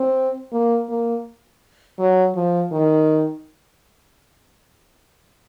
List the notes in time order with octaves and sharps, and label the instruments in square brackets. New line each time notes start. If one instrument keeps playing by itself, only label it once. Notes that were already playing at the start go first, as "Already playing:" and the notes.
Already playing: [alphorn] C4
A#3
A#3
F#3
F3
D#3